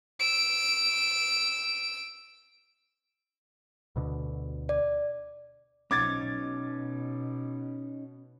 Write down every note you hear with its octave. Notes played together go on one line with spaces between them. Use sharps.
E6 D7
D2 B2 D3
D5
B1 F3 C#4 D#4 D6 G#6 A6
B2